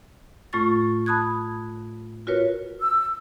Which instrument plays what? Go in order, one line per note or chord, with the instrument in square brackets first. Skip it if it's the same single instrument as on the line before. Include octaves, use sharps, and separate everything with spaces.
[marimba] A2 A3 F4 C#6 A6
A5 B5 D#6 F#6 G#6
F4 F#4 A#4 B4 C#5
[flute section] E6